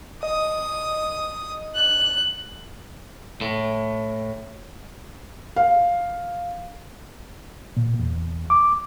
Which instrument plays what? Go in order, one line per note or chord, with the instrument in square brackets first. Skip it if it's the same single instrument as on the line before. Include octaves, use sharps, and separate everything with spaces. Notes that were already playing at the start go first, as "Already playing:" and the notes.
[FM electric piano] D#5 [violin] D#6
[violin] F#6
[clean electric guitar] A2
[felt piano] F5
[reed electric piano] A#2
E2
D6